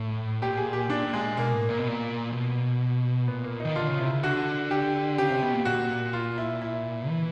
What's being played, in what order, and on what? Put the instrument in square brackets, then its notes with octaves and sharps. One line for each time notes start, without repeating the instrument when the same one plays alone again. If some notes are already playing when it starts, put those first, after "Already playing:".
Already playing: [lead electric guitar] A2
[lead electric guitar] A#2 [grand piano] G4
[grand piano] G#4
G4
[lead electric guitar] A#2 [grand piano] D4
[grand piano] G#3
[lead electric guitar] B2 [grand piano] A#3
[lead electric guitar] A2
A#2
B2
A#2
B2
[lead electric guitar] A#2 [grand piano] B3
[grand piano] A#3
[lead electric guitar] D#3 [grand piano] D#4
[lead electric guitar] D3 [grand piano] F4
[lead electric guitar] C#3
[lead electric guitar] C3 [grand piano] E4
[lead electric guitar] C#3
[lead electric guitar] D3 [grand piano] F#4
[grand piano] G4
[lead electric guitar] C#3 [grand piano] G4
[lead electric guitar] C3
B2
A#2
[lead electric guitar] A#2 [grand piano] F#4
[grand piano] F4
E4
E4
[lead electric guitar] E3